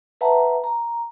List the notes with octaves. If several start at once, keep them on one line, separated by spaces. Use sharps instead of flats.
B4 E5 F#5 A5 A#5
A#5